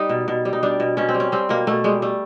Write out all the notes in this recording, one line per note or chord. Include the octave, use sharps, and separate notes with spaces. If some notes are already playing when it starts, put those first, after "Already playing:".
Already playing: G3 D#4
B2
B2
G3
D#4
G3 D4
B2
B2 C#4
C4
G3
C#4
G3 C4
B2 A#3
B2 A3
G3 G#3
G3 A3